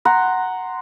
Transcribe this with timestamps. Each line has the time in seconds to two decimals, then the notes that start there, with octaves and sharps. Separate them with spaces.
0.05 F#5 A#5 C6